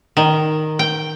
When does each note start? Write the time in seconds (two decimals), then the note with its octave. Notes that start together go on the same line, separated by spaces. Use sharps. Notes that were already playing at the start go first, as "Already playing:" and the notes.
0.17 D#3
0.79 G5